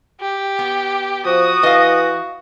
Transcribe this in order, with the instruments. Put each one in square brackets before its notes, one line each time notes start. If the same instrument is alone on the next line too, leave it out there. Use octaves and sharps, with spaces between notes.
[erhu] G4
[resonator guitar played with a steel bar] B3
[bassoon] F3 [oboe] F#4 [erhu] D#6
[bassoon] E3 [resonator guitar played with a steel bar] D#5 F5